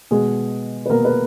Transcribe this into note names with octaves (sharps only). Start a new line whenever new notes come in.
B2 G#3 G#4
B4
B2 A#3 A#4
B4